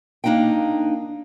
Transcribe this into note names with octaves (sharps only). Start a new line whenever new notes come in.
A#3 D4 D#4 F5 G5